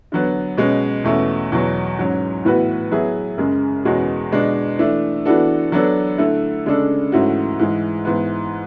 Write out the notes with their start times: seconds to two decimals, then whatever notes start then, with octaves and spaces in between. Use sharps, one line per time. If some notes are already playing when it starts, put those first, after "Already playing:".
0.12 D3 F#3 B3
0.58 B2 G#3 C#4
1.04 E2 B2 A3 C#4
1.52 E2 B2 F#3
1.98 G#2 F#3 C#4
2.45 A2 E3 B3 F#4 B4
2.91 F#3 B3 E4 G#4
3.38 F#2 C#3 G#3
3.85 E2 B2 G#3 C#4 F#4
4.32 B2 G#3 D4
4.79 E3 A3 D4
5.25 E3 B3 D4 F#4 A4
5.72 F#3 B3 D4 A4
6.18 D3 A3 E4 A4
6.66 C#3 G#3 D4 A4
7.12 G#2 E3 A3 C#4 F#4
7.59 G#2 E3 G#3
8.05 G#2 E3 B3